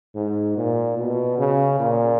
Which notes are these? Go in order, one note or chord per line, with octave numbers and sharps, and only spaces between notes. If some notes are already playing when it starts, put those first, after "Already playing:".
G#2
A#2
B2
C#3
A#2